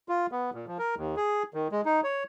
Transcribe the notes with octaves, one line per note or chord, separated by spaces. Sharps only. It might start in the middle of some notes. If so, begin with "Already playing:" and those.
F4
B3
A#2
F3
A#4
D#2
G#4
D#3
G#3
D#4
C#5